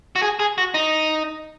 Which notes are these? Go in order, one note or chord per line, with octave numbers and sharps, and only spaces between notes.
F#4
G#4
G#4
F#4
D#4